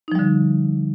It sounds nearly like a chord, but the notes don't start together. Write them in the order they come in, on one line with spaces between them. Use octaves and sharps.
D#4 F3 G3 D3